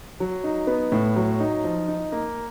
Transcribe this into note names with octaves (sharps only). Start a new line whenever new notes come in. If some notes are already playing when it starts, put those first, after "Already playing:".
F#3
D#4
B3
A2
F#3
D#4
F3
D#4
A#3